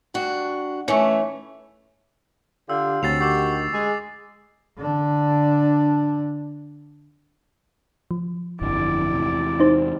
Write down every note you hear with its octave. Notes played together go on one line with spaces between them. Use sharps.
G2 D4 F#4
E3 A3 C#4 C#5 G#5 C#6
D3 F4 G4 E6
D2 C4 C#4 F#4 A6 C7 F7
D3 D#3 F#4 G4 D6 E6 C7
G#3 G#4
D3 D4
F3
G1 F2 D3 E4 D5
E2 C3
D#4 C5